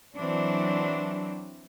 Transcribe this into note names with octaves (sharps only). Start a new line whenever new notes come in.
E3 F#3 C4 D4